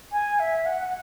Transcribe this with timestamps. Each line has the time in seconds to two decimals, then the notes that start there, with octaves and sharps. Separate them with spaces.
0.12 G#5
0.39 E5
0.66 F#5